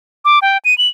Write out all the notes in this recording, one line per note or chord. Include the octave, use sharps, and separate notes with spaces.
D6
G5
D#7
F#7